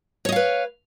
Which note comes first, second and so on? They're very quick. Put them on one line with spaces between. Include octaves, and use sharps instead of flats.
C#5 D#5 F5 B4